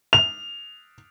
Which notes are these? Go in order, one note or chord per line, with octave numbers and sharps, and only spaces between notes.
F7